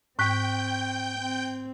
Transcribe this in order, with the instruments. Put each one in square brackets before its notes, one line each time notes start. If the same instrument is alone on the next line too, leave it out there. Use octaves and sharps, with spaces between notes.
[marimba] G#2 [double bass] C4 [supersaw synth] G5 G6 [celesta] C#6 F#6 B6
[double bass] C4